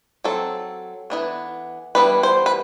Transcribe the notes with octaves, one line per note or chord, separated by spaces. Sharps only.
F#3 C4 A4
E3 B3 D4
E3 G3 B3 D4 B4
C5
B4